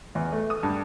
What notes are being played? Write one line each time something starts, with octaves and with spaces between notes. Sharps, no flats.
E2
A3
D#6
G2